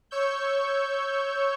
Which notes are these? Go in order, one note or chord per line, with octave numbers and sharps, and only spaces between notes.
C#5 C#6 E6 G6